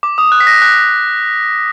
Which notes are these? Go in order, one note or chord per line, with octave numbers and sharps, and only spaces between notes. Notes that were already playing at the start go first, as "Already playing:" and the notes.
D6
D#6
F#6
B6
A#6
F#6